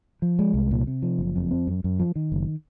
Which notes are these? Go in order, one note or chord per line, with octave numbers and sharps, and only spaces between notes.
F3
G#3
C2
A#2
C3
F3
F#1
F2
C4
F#2
F#2
F3
D#3
F#1